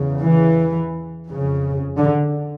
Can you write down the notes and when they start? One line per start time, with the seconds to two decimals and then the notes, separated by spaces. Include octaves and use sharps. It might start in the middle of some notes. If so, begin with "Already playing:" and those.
Already playing: E2 C#3
0.23 E3
1.27 F2 C#3
1.97 D3